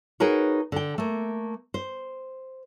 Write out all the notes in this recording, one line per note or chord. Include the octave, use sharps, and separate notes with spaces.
D#4 F#4 G#4 A#4 B4 C#5
D3 G5
A3 A#3
C5